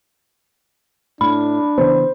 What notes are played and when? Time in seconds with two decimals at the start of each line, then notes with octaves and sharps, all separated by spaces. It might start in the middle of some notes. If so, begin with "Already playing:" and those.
1.21 A2 D4 B5
1.78 C#3 E3 B3 C5